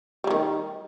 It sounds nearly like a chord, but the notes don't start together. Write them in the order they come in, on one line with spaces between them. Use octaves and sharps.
G3 F#3 D#3